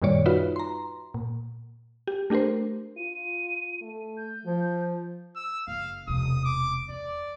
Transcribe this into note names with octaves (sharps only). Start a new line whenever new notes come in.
F#2 A#2 D#3 G3 C#5 D5
D#4 F4 F#4 B4 E5
A#5 C6
A#2
G4
A3 D4 G4 A#4 C5
F4 D#7
A3
G6
F3 F4
E6
F#1 F5
E1 C3 D#6
D6
E2 D5